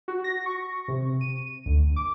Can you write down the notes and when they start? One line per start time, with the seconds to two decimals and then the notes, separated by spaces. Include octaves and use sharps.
0.08 F#4
0.24 A#6
0.46 C#6
0.88 C3
1.21 D#7
1.66 D2
1.96 D6